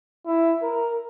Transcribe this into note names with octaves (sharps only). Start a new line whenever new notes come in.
E4
A#4